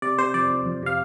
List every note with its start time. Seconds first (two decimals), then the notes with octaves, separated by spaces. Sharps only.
0.02 C3 D5
0.19 C3 C5
0.34 F2 D5
0.50 F2
0.66 F2
0.83 C3 F5